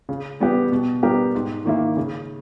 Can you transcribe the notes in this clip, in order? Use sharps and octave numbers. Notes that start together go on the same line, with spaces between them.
C#3
G3 B3 G4
B2
G3 B3 G4 A#4
G#2
D#3 A#3 E4 G4
C#3